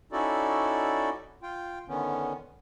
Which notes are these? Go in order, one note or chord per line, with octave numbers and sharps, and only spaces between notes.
C#4 D#4 E4 F#4 A4 D5
F4 G5
D3 D#3 B3 C#4